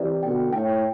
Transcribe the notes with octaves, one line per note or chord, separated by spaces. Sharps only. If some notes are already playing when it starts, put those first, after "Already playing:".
Already playing: C3 E3 D5
B2 D3 G5
A2 G5